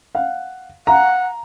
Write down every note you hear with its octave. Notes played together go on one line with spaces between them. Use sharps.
F5 F#5
F5 F#5 A#5